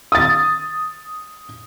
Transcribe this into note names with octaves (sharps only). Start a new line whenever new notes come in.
D#6 A6